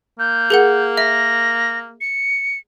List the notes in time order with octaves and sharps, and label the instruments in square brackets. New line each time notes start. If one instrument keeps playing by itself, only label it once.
[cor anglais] A#3 [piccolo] G6
[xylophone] G#4 A#4 F#5
[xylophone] E5 [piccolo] A#6
[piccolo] C#7